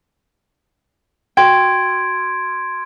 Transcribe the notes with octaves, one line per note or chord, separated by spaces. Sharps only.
F#4 G5 C6 G#6 D7